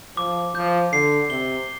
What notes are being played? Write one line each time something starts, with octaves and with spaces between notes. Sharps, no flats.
F3 D6
F3 G6
D3 C7
C3 G7